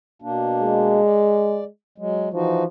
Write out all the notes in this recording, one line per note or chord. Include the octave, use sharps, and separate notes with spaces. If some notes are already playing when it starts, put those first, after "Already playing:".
B2 A#3 D4
G#3
D5
F#3 G#3
E3 F3 D#4 F#4